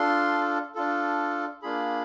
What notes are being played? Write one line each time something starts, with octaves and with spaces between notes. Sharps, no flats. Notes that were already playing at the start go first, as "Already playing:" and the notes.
Already playing: D4 F4 A4 C6
D4 F4 A4
A#3 D4 F4 G#4 B5